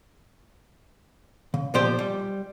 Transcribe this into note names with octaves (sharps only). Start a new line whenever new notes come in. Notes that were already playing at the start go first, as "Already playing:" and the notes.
C#3
B1 A#2 F3 G4 C5 D5
G3